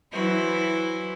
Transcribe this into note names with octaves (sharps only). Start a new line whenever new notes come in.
E3 F#3 E4 F#4 B4 C5